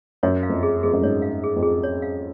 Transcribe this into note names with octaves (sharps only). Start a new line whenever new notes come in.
F#2 C#5
F5
F2
G#4
F2 G#4
F#2
G#2 C#5
F5
G#4
F2
G#4
C#5
F5